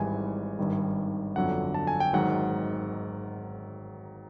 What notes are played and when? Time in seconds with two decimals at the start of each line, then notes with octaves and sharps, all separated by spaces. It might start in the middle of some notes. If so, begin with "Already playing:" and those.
Already playing: G#1 G#2 E3 G3 G#5
0.59 G#1 G2 D#3 G3
1.36 G1 F2 D3 F#3 F#5
1.74 A5
1.87 G#5
2.00 G5
2.13 G#1 G#2 D#3 F#3 F#5